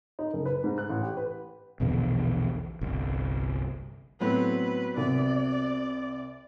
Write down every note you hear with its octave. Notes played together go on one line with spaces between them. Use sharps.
D#4
F#1
B4
G#2
F#6
A1
G4
B4
A#1 E2 B2 D3
G1 C2
A2 F#3 B3 C4 B4
C2 C3 D5